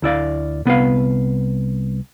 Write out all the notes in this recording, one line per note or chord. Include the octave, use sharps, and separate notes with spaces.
D2 E4 D5 F5
C2 B3 B4 F5